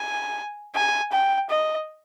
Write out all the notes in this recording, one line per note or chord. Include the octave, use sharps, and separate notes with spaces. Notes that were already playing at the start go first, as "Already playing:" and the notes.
Already playing: G#5
G#5
G5
D#5